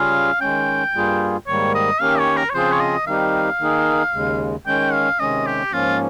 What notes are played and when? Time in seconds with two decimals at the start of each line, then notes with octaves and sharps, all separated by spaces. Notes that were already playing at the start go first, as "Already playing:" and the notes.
Already playing: C#3 G3 C#4 F4 G#4 F5
0.41 D#3 G#3 C#4 G5
0.94 G2 G3 A#3 F4 G#4
1.47 G#2 D#3 G3 A#3 C#5
1.75 D#5
2.01 D#3 A#3 C#4 G4 F5
2.19 C#5
2.36 A#4
2.50 C#5
2.54 C#3 F3 C4 F4 G#4 C5
2.72 C#5
2.80 D#5
3.07 D#3 G3 C4 D#4 G4 F5
3.60 D#3 A#3 D#4 G#4
4.14 D#2 C#3 G#3
4.66 D#3 G#3 C#4 G5
4.93 F5
5.20 C3 D#3 G#3 C#4 D#5
5.46 G4
5.72 G#2 F3 A#3 C#4 F4